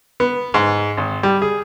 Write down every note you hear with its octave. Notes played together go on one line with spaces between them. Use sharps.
B3
G#2
G#1
G3
G#4